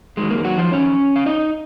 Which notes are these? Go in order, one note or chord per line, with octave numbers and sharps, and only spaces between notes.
F#2 D#3 F#3 G#3
A#3
F#3 F#4
F3 F4
C#4 C#5
F5
D#4 D#5